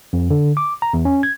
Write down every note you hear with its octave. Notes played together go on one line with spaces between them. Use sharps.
F2
D3
D6
A#5
E2
C#4
G#6